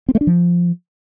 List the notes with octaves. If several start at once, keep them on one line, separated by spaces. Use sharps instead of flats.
C4
A3
D4
F3